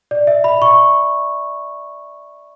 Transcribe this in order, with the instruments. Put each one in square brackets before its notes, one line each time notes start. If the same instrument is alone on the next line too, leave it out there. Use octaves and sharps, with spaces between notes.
[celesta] D5
E5
B5
C#6